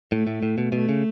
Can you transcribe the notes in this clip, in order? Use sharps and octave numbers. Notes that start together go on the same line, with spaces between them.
A2 A3
A2
A2
B2
B2 A3
C#3